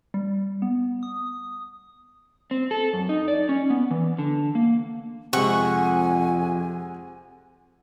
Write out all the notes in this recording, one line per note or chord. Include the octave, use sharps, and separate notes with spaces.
G3
B3
D#6
C4
A4
F#2
D#4
D5
C#4
B3
E3
D3
A#3
F2 C3 G#3 F#5 G#5 C#6